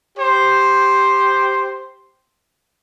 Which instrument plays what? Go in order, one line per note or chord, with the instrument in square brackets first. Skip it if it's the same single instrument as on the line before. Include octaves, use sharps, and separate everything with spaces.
[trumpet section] G4 C5